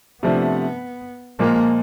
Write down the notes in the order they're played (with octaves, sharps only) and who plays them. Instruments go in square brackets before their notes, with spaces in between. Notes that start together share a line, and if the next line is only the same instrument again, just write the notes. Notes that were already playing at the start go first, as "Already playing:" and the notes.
[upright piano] C3 F3 A3 D4 [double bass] B3
[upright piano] A#2 F3 G#3 [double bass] A#3